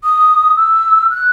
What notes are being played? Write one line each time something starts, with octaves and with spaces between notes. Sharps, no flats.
D#6
E6
F#6